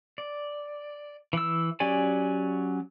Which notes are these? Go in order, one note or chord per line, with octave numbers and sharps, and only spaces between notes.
D5
E3 E6
F#3 C#4 G4 D5 G#5